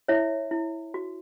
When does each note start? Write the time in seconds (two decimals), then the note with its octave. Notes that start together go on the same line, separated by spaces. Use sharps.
0.08 E4 C#5 E5
0.51 E4
0.94 F#4